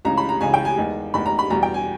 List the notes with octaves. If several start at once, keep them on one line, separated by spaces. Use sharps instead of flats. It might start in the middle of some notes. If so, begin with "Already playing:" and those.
C#2 C#3 E3 A#5
B5
A#5
C#2 C#3 E3 G#5
G5
G#5
E2 D#3 G#3
E2 D#3 G#3 B5
A#5
B5
E2 B2 G3 A#5
G5
G#5